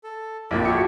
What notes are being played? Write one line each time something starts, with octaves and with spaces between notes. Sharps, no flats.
A4
A#1 F2 A#2 E4 F4 G4 D5
F#4 G#4 A4 C#7